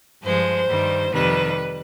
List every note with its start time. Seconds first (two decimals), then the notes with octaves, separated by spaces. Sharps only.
0.23 G2 F3 G#3 C5
0.68 G2 D#3 G3
1.13 F2 C3 D#3 G3 B4